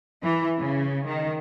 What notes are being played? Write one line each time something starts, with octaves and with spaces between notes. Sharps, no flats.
E3
C#3
D#3